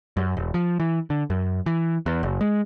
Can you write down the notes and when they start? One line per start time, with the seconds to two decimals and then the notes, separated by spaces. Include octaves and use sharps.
0.17 F#2
0.37 E1
0.54 F3
0.80 E3
1.10 D3
1.30 F#2
1.66 E3
2.06 E2
2.23 F#1
2.41 G#3